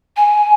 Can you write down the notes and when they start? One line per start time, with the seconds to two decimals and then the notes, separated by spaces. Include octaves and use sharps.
0.17 G#5